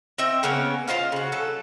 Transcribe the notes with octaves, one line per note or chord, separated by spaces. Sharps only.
C4 D#5 E5 G5
C#3 A#3 B3 C#4
F4 C5 D#5 F5
C#3 F#4
F#3 A4